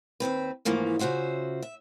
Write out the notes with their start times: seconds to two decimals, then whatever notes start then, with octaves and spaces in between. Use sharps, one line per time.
0.20 D#2 G#2 C4 B4
0.65 G#2 E3 F3 A3 A#3
0.99 C#3 F4 F#4 C5 E5
1.62 E5